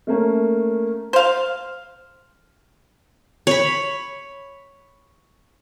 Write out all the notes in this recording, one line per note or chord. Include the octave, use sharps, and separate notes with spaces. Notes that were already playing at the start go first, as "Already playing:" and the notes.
A3 A#3 C#4
C5 F5
C#5 B5